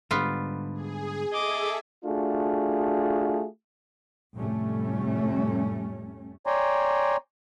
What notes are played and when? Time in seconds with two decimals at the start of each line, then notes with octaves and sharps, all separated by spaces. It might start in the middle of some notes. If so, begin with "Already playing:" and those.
0.11 G#2 D3 G3 B3 F4
0.74 G#4
1.33 G#4 A4 D#5 E5 D6
2.05 A3 D4 F4 F#4 G#4
4.35 F1 A2 G3 A3 C#4
6.47 C#5 D5 G5 G#5 A#5 C6